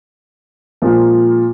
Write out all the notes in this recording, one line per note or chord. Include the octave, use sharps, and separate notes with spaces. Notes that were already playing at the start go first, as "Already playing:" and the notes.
A#2 F3 G#3